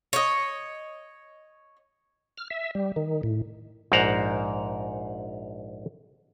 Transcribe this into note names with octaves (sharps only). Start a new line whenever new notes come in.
C#5 D#5
F6
E5
G3
D#3
A2
A#1 G#2 A#4 C5 F#5 A#5